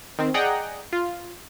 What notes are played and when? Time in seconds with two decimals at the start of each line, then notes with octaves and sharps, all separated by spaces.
0.19 D#3 C4
0.34 G#4 D5 D#5 F#5 G5 A#5
0.92 F4